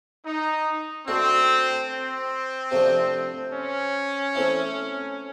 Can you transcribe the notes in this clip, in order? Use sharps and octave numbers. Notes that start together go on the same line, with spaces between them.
D#4
A3 C4 D4 F#4
C4
C3 F3 A3 D4
C#4
A3 C4 E4